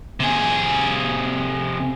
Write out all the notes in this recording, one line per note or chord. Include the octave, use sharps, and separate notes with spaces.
C3 G#4